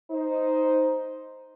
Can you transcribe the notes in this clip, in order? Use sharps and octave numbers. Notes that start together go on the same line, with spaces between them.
D#4 C5